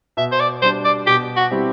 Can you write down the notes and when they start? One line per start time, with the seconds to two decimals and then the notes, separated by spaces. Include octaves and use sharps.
0.17 B2 E5
0.32 C5
0.40 D5
0.62 G3 D4 C5
0.84 D5
1.07 B2 G4
1.37 F#4
1.51 G3 C4 E4 G4